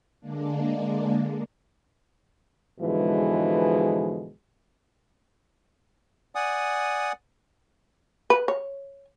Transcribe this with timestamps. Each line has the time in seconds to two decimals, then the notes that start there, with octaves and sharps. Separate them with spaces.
0.20 D3 G#3 A#3 D4
2.80 G#2 B2 D3 E3 F3 G#3
6.35 D5 F#5 G#5 D#6
8.30 B4
8.48 C#5